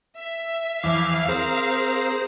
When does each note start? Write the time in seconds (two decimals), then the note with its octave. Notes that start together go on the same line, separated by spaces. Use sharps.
0.18 E5
0.84 E2 E3 F3 E5 F5 D6
1.28 C4 G#4 A#4 C5